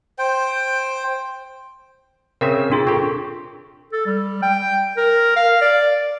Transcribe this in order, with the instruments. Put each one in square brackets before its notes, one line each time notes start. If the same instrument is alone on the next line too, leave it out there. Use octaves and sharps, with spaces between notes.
[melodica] C5 G5
[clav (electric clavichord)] C#3 C4 E5 [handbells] A#4
[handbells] D4 F4 G#4 [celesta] C6
[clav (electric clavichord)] C4 G4 [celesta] A4 C#6
[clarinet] A4
G3
G5
A#4
F5
D5